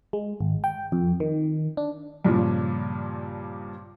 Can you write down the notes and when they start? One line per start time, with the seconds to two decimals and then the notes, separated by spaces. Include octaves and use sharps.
0.13 G#3
0.41 G#1
0.64 G5
0.92 F2
1.20 D#3
1.77 D4
2.25 G2 A#2 C#3 F3